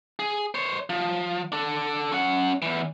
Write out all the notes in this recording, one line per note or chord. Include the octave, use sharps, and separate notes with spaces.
G#4
C5 C#5
F3
D4 A4
C#4 F#5
E2 E3